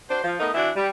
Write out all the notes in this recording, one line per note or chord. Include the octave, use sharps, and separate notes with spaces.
D4 F#4 C5
F3
A3 B3 D#4 A#4 D#5
E3 D4 E4 F#4
G3